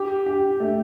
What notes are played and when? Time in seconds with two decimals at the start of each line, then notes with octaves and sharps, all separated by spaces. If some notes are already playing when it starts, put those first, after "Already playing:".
Already playing: G4
0.26 G4
0.60 A3